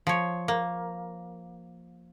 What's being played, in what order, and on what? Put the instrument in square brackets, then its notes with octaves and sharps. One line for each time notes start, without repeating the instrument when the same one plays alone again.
[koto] F3 C#5
A#3